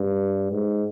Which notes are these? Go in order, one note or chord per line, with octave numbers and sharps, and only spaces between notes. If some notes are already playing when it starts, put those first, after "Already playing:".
Already playing: G2
G#2